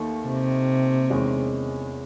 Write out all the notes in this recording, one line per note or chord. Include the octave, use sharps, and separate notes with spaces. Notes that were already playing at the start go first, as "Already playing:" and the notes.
Already playing: D#2 D#3 A3 D#4
C3
E2 D#3 G#3 C#4